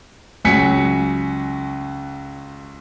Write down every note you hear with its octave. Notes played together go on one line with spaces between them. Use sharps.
C#2 F#3 G#5 B6 C#7